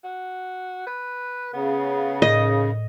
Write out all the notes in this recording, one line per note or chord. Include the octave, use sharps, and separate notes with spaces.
F#4
B4
C#3 B3
A2 D#3 D#5